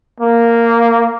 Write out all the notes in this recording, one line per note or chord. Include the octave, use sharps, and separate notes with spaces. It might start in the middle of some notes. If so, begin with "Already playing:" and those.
A#3